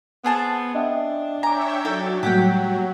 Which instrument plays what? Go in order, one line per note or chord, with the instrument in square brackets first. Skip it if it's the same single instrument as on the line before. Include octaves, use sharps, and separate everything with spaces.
[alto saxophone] B3 [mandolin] C4 G#4 A5
[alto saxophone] D4 [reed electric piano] D#5 E5 G5
[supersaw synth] C#5 E5 G5 [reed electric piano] G#5 D6 [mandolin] A#5
[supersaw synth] F#3 [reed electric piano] D#4 [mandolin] A4 G5
[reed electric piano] A2 G3 A#3 [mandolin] G4 F#5 G5